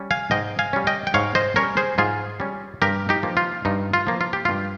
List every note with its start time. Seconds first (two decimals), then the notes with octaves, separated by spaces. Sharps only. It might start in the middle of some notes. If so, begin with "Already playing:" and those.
Already playing: G3 C#4
0.11 F5 G#5
0.31 G#2 D#5 G5
0.59 F5 G#5
0.73 G3 C#4
0.87 D#5 G5
1.07 G5
1.14 G#2 C#5 F5
1.35 C5 D#5
1.56 G3 C#4 A#4 C#5
1.77 G#4 C5
1.98 G#2 F4 G#4
2.40 G3 C#4
2.82 G2 G4 A#4
3.09 D#4 G4
3.23 F3 A#3
3.37 F4
3.65 G2 D#4
3.93 F4
4.07 F3 A#3
4.21 F4
4.33 G4
4.45 G2 F4